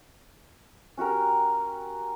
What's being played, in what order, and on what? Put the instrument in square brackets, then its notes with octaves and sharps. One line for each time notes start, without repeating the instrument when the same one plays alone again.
[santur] C#4 F#4 G4 A#4